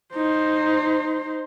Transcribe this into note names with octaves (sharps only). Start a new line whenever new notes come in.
D#4 C5